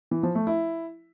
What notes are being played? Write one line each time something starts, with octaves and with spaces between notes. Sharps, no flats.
E3
F3
A3
E4